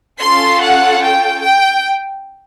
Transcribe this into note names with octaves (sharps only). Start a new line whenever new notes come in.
C#4 F4 A4 C6
F#5
G5
G5